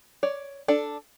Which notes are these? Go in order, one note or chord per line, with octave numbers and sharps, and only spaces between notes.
C#5 D5
D4 A4 D5